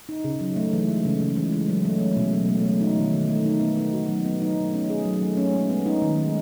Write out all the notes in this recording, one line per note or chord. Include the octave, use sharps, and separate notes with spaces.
D#4
C#3
F#3
A3
E3
G#3
C#3
C#3
E3
G#3
F#3
A3
C#4
B2
F#3
A3
A3
D#4
D#3
D#3
A3
D#4
B3
D#4
F#4
F#3
B3
D#4
A3
C#4
G#4
F#3
A3
C#4
G#3
B3
D#4
D#3
G#3